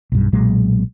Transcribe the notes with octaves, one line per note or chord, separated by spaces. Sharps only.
B1 G2
B1 A#2 F#3 G#3